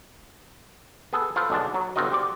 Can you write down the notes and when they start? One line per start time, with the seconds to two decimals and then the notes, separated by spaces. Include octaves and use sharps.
1.13 B3 G#4 A4
1.36 F4 A4 B4 C5 F5
1.50 B1 D3 G#3 D4 A5
1.74 F#3
1.96 G1 C4 F4 F#4 D#5
2.12 G4 C5 D5